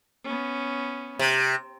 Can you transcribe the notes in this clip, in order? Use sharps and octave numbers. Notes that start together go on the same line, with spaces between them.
B3 C#4
C3